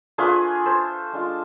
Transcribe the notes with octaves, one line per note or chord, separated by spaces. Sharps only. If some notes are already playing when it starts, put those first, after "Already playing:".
A3 D4 F4 G#4 B4
A4 C5
G#3 D4 F4